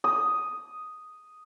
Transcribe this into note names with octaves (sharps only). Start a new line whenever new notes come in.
D#6